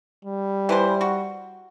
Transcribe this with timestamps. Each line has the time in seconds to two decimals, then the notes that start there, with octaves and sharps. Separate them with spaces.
0.25 G3
0.69 E3 B4 C5
1.01 F#4